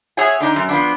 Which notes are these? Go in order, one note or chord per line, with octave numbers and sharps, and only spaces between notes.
G#4 C#5 E5 F#5 G#5
D3 D4 D#4
F#2
F3 B3 D4